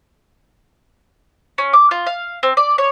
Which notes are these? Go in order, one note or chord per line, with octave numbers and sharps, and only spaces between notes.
C#4
D6
F4
F5
C4
D5
C#5